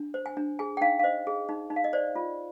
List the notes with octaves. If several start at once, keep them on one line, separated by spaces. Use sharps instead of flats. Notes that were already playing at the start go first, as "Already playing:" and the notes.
Already playing: D4
C5
G#5
D4
G#4 G#5
G5
D#4 F5
F5
C5 D#5
G#4
D#4
D#4
F5
D#5
C5 D5
F4